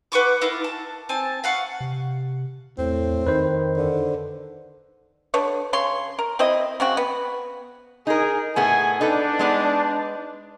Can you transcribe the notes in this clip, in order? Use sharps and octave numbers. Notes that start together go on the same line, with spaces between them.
B4 F#5 C#6 D6
E4 F4 A#4
A5
C4 G#5 A5
F5 F#5 C#6
C3
E2 A2 C4
F2 D#3 B4 C5
D3
D3 B4 C#5
C#3 C#5 C6
A#4
C4 E4 C5 D#5
C#3 C4 F#4
B3
D#4 G#4 A#4
A2 B3 G#4 G#5
D4 D#4 A4 B4
G#3 B3 D#4